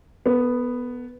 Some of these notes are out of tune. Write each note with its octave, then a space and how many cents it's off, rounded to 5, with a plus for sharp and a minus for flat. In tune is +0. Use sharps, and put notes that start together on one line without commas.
B3 +0 A4 +45